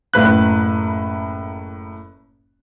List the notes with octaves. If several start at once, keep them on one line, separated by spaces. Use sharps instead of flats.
F#1 A2 B4 F#6